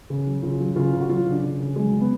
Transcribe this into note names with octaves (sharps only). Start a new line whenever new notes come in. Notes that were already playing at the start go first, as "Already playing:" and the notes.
C#3
F#3
C#3 F4
F#3
C#3 F4
C#3
F#4
F#3 F4
C#3 D4
C#3
C#3
F#3 G#3
C#3
B3